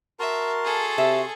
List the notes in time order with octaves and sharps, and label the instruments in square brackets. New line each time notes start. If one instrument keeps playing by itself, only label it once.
[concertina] F#4 A5 C6 [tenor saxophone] A#4 [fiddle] E5
[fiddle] G#4 A4
[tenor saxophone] C3 [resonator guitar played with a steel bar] E5